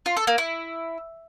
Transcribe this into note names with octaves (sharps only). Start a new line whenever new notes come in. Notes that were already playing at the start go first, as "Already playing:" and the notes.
F4
A4
A#3
E4